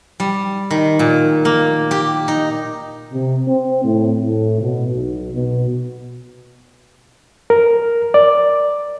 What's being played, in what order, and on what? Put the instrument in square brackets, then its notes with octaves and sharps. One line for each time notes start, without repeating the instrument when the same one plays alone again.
[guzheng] G3
D#3
A#2
A#3
G4
D#4
[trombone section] C3
C4
A2
A2
B2
B1
B2
[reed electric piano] A#4
D5